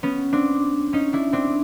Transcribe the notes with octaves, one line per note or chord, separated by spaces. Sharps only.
B3 C#4
C4 D4
C#4 D#4
D4 E4
C4 D4